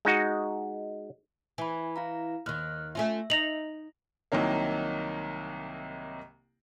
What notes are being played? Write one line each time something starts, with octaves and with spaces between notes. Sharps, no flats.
G#3 D#4 F#4
E3 G#5 B5
E4 F5 A#5
D#2 D#3 F6 F#6
A3 C#4 F4 E5
D#4 A#6 F7 F#7
C2 C3 D#3 F#3 A#3